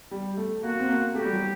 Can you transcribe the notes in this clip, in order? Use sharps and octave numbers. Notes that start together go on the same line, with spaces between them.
G3
A3
A#3 F#4
C4
A#3
A3 G4
G3
F#3